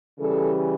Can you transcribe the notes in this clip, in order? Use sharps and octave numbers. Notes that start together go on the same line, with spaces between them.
C#3 E3 G3 A4